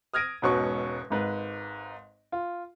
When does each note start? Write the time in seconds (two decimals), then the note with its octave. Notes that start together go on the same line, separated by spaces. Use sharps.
0.14 D#6 F6 G#6 A#6 D7 D#7
0.42 E1 G#2 B2 C#4 B4 C#6
1.10 G#1 G#2 B4
2.32 F4